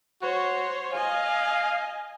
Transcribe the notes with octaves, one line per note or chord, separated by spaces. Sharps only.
F#4 C5 C#5
D#5 F5 G#5